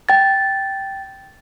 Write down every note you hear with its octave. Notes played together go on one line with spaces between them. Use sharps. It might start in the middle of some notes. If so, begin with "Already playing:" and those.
G5 A6